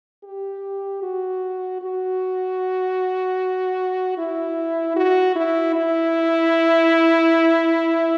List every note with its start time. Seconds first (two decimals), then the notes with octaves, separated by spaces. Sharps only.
0.24 G4
1.03 F#4
1.82 F#4
4.18 E4
4.96 F#4
5.36 E4
5.75 E4